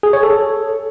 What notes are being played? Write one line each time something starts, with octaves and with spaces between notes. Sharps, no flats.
G#4
C#5
A4